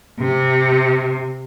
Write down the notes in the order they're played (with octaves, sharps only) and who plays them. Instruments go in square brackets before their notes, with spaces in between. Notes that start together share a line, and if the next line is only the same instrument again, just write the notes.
[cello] C3